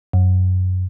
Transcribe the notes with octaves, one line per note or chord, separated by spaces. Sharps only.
F#2